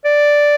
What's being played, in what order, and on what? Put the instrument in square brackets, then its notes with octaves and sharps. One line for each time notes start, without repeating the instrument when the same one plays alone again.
[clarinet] D5